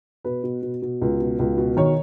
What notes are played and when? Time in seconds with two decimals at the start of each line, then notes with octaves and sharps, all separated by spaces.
0.25 B2 B4
0.44 B2
0.63 B2
0.82 B2
1.02 C#2
1.20 B2
1.39 C#2
1.58 B2
1.77 D#3 C#5